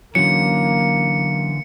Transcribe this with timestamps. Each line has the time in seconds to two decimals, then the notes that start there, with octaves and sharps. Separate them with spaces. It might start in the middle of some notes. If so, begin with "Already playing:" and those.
0.15 D3 E3 F#3 A#3 C#4 C#7